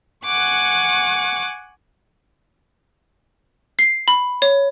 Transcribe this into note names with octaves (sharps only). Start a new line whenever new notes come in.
F#5 G#5 C#6 D6 F#6
C7
B5
C#5